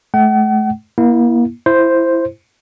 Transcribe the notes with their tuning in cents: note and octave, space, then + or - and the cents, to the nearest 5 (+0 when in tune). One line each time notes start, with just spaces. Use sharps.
A3 -35 F#5 +40
A#3 +35 E4 +0
E4 +15 C5 +0